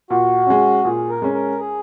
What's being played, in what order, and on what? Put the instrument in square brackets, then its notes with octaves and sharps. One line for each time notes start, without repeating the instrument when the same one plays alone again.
[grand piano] A#2 [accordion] F#4
[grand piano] G#3 C#4
[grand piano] A#2 [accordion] G#4
[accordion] A#4
[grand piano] G#3 C#4
[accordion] A#4
G#4